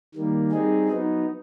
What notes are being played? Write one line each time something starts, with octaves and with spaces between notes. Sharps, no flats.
D#3 G3 A#3
G3 C4 D#4 G#4
F#3 B3 D#4